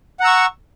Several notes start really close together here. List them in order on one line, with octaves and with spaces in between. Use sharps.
F#5 A#5 E6 C#6